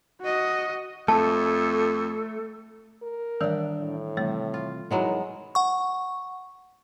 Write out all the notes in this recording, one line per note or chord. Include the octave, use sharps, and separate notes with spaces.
F#4 D#5
F2 A3 A4 A5
A#4
D#3 E3 G3 D4 E5 F#5
A2
C3 E3 G3 A3
F4
F#3 G#3 B3 D#4 E4 A#4
F#5 C#6